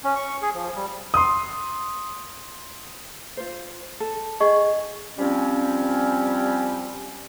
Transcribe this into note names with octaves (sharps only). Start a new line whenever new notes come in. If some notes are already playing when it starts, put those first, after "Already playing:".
C#4
C#6
G#4
F3
G3
C6 D#6
F4 C5
A4
G#4 D#5 C#6
F3 G3 C4 C#4